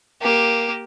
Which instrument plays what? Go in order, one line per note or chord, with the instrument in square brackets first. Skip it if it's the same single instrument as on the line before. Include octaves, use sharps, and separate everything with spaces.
[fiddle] A#3 G4